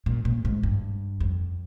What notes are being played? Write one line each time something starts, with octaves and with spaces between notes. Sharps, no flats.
A#2
A#2
G#2
G2
F2